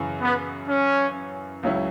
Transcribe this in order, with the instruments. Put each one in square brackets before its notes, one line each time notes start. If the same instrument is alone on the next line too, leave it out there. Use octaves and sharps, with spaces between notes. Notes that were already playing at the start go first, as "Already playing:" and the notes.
Already playing: [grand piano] F#2 C#3 E3
[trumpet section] B3
C#4
[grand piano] C#2 C#3 F#3 C#4 E4